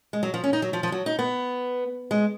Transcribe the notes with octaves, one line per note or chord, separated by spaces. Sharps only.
G#3
F#3
F3
C#4
D#4
F#3
F3
F3
F#3
D#4
B3
G#3